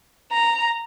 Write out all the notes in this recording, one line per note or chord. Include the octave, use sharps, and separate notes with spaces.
A#5